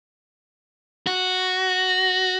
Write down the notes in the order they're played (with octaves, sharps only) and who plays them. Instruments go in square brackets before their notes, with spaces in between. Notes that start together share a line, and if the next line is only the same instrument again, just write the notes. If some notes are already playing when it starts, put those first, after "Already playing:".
[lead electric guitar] F#4